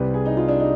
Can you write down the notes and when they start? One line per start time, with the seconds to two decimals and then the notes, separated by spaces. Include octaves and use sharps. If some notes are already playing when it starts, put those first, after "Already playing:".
Already playing: C2 C3 G3 B4
0.14 G#4
0.26 D#4
0.37 F4
0.48 D4
0.60 D#4